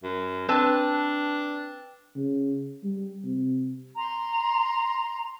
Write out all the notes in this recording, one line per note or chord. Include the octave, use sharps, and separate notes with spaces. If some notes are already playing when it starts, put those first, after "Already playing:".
F#2
C4 D4 B4 A5
C#3
G3
C3
A#5 C6